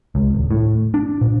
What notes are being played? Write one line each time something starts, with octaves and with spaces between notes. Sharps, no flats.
C#2
D#1
A2
D4
A#2